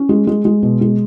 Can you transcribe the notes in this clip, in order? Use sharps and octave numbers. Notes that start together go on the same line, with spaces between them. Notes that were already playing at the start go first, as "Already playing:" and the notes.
Already playing: C#4
G#3
G#3
G#3
B2
G#3